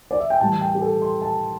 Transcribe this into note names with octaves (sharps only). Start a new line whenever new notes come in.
D5
E5
G5
A2 E3 G3 A5
G5
G4
A4
C6
A5